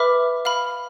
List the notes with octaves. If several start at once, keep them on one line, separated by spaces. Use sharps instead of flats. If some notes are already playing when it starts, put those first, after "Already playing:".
Already playing: B4 E5 B5 D6 F6
F5 B5 F6